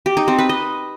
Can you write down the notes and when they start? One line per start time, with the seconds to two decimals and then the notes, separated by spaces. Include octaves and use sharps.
0.06 G4
0.17 D#4
0.28 C4
0.39 B4
0.49 D#5